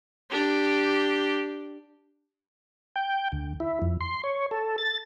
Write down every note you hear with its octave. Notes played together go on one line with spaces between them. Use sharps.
D4 G4
G5
D2
E4
F2
C6
C#5
A4
A6